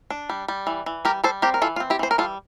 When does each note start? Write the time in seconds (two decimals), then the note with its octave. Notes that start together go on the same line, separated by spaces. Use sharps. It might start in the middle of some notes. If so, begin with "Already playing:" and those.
0.10 D4
0.29 G3
0.48 G3
0.67 E3
0.86 E3
1.05 G3 G4 A#4
1.24 G3 A4 C5
1.42 C4 G4 A#4
1.54 A#4
1.62 E3 F4 A4
1.76 F4
1.80 C4
1.90 E4 G4
1.99 E3 C5
2.11 A#4
2.18 G3 F4 A4